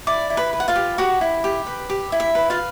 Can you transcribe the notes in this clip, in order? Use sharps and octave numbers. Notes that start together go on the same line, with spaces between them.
E4 D5 D6
E4
B4 B5
B4
F#5
F4 F5
G4
F#4 G4 F#5
E4
G4
B4
G4
E4
E5
B4
F4 F5